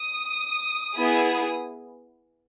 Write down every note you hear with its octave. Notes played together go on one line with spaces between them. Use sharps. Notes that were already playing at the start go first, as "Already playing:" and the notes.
Already playing: D#6
B3 E4 G#4